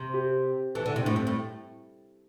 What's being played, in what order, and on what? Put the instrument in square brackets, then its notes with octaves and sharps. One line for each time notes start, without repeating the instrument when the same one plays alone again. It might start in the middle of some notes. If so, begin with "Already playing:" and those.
Already playing: [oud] C3
[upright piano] G4
[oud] E3 [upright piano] A4
[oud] D3
[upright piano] E4
[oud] C3
[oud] A2 [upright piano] D4
[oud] G2 [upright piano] C4
[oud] A2